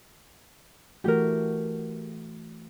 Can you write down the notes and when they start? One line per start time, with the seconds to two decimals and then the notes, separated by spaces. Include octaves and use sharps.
1.04 E3 A3 F#4 G4 A#4